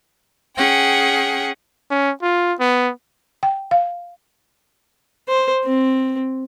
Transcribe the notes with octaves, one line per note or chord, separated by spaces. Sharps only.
C#4 G#4 F#5 G5
C#4
F4
B3
G5
F5
C5
C4